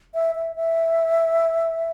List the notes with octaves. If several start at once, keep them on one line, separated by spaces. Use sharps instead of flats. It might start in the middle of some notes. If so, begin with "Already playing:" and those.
E5
E5
E5